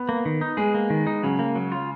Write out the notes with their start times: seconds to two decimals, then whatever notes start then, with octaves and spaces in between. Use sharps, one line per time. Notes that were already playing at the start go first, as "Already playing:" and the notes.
Already playing: B3
0.09 A#3
0.25 D#3
0.41 D#4
0.57 G#3 G#4
0.74 A#3
0.90 D#3
1.07 D#4
1.23 C#3 F#3
1.39 A#3
1.55 F#3
1.72 F4